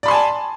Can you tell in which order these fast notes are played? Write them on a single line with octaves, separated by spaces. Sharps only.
D5 B5 C6 G#5 A5